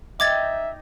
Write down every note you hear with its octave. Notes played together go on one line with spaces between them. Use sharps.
D#4 D#5 E5 G5 D6 G#6 A6